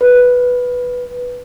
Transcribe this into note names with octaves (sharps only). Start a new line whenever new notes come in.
B4